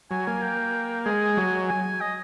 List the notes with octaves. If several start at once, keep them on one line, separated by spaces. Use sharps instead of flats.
F#3 G#5
A#3 G#5
G5
G#3 G#5
F#3
G#5
D#5